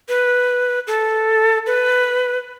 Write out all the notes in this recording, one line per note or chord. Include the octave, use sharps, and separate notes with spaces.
B4
A4
B4